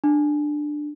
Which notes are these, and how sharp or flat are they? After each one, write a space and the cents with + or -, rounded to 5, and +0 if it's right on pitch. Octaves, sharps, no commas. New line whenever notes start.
D4 +15